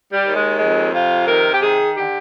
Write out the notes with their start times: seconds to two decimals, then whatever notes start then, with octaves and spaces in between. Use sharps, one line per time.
0.13 G3
0.25 D#2
0.36 G#3
0.59 F2 G#3
0.93 C3 F4
1.28 D#3 A#4
1.54 G4
1.63 D#3 G#4
1.97 D3 G4